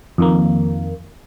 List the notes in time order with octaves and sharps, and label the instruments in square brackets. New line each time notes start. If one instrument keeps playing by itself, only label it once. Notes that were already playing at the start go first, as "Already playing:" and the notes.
[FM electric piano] F2 D#3 A#3